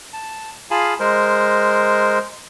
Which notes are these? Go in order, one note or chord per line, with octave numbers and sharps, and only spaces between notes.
A5
F4 G#4 F5 G#5 A5 B5
G#3 A#4 C5